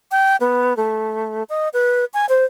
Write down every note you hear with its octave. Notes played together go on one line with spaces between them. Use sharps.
G5
B3
A3
D#5
B4
G#5
C5